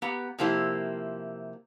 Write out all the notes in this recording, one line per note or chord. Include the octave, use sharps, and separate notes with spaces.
B3 G4 A#5
C3 F3 A#3 E4 G4 C5